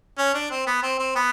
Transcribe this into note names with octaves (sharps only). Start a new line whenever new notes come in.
C#4
D4
C4
B3
C4
C4
B3